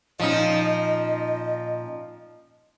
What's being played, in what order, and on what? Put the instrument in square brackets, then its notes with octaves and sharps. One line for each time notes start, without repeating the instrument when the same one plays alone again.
[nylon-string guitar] A#2 C#4 [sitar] F3 D#4 [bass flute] D#5